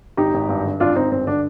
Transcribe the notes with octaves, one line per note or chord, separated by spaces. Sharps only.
G#1 D#4 G4
G#1
G2
D3
G#1 D4 F4
G#1 C4 D#4
G2 C4
D3 D4